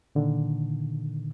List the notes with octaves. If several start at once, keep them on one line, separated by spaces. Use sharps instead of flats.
A#2 D3 D#3